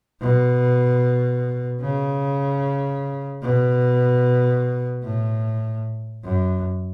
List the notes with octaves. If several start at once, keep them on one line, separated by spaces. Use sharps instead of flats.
B2
C#3
B2
A2
F#2